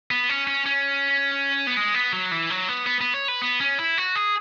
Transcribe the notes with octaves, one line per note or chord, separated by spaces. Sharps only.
B3
C#4
C#4
C#4
B3
G#3
B3
F#3
E3
F#3
B3
B3
B3
C#5
B4
B3
C#4
E4
F#4
G#4